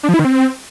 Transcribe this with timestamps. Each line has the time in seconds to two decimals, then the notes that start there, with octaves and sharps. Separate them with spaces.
0.03 D4
0.09 F3
0.14 E4
0.19 D#3
0.25 C4